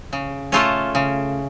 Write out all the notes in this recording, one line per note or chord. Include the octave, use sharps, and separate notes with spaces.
C#3
A3 C#4 F4 A4
C#3